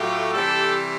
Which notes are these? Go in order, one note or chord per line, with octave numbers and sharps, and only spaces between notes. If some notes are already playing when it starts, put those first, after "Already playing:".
Already playing: A2 F#3 A3 F4 G4
C3 E3 G3 G4 A4